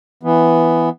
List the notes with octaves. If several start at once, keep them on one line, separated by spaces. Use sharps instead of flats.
E3 B3